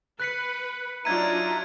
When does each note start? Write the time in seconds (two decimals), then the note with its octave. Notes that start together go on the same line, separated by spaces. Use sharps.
0.20 B4 F#6 B6 C#7
1.05 F#3 D4 D#4 F4 E5 A#5 G#6 D#7